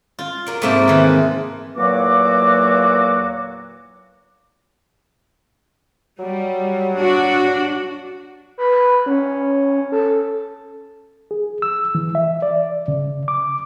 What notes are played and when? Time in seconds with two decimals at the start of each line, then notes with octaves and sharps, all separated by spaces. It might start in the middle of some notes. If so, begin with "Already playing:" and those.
0.19 F4
0.47 F#3 A#4 D5
0.62 G#2 C3 A3 A#3 E5 A5
0.88 D#3 E3
1.76 E2 A#2 F#3 A#3 F#4 D6
6.19 F#3 G3
6.97 D4 F#4
8.58 B4
8.72 B4
9.06 C#4
9.92 A4
11.31 G#4
11.62 E6
11.95 E3
12.15 E5
12.42 D5
12.88 C#3
13.28 D6